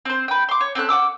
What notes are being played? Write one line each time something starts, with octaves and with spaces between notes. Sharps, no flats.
C4 C5
B4 G5
C6 D6
C#5
C4 C#4 A4 F#6
F#5 G5 D6 E6